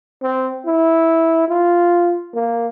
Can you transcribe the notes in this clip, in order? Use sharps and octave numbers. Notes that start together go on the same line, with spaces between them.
C4
E4
F4
A#3